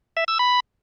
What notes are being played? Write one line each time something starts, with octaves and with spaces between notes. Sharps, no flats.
E5
E6
B5